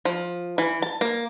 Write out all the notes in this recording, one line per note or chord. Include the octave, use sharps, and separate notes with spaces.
F3
E3
A5
A#3